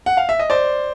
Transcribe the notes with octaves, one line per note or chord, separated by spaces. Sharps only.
F#5
F5
E5
D#5
C5 D5